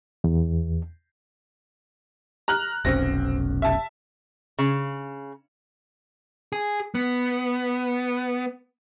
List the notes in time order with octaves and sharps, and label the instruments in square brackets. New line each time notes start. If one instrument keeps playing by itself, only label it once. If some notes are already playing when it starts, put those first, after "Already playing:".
[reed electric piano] E2
[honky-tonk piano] A#5 F6 F#6
[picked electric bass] F1 B1 C#4 [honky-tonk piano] C4 A#6
[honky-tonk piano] E5 A5
[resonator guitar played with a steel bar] C#3
[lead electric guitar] G#4
B3